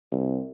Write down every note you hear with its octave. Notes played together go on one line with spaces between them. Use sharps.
C2